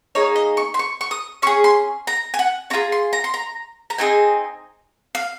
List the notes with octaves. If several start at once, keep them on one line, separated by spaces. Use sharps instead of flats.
A#3 D#4 G#4 C#5
D#5
C#6
C6
C#6
C#6
D#6
C#4 G#4 C#6
C6
A#5
G#5
F#5
C#4 F4 G#4 A#5
C6
A#5
C6
A#5
A#5
C4 D#4 G#4 G#5
F5